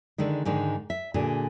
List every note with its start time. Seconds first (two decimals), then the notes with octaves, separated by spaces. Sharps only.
0.18 D3 D#3 G#3
0.45 G#2 D3 D#3 G#3
0.90 E5
1.14 A#2 D3 F#4 G#4